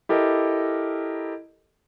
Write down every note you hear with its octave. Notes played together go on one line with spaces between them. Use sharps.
E4 G4 A4 A#4 D#5